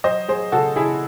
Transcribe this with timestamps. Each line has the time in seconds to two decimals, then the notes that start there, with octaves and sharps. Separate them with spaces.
0.04 F#3 C5 D#5
0.28 F#3 G#4 C5
0.52 C#3 F#4 A4
0.76 C#3 E4 G#4